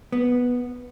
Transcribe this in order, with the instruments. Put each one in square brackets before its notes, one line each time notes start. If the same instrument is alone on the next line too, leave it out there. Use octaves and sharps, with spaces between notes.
[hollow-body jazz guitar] B3